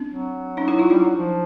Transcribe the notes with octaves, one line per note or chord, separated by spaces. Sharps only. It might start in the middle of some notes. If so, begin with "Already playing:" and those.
Already playing: C4 D4
F#3
C#4 D#4
D4 E4
D#4 F4
G3 D4 E4
F#3
F3